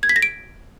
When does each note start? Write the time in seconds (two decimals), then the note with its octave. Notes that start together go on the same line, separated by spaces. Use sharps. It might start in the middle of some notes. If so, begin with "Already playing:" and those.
0.03 G#6
0.09 B6
0.16 A#6
0.22 D7